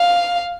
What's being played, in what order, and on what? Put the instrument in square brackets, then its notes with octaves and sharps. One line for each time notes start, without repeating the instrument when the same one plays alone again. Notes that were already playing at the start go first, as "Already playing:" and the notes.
Already playing: [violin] F5